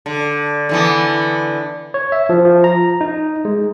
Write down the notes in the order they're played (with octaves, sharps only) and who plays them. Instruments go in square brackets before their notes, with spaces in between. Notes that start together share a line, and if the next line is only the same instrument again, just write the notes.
[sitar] D3
D3 E3 B3
[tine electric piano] C#5
E5
F3
F3
A#5
D#4
G#3